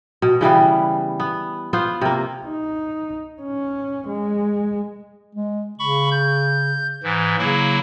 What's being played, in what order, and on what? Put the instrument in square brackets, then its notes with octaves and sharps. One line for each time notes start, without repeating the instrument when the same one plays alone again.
[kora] B2
C#3 E3 G3 B3
B3
B3 F4 C5
C3 A#3
[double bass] D#4
C#4
G#3
[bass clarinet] G#3
[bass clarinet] C#3 [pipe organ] B5 C#6
[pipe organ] G6
G#2 E3
[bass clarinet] C#3 [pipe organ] F#3 A#3 E4